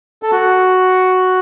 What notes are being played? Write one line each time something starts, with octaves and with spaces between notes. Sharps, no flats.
A4
F#4